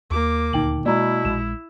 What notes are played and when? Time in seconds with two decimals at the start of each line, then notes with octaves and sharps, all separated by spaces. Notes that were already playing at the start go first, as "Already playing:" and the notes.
0.11 D#2 A#3 D6
0.53 D#1 D2 D#4 G5 F#7
0.86 B2 G#3 A#3 E4 D5 A#5
1.25 A#1 G#3 E7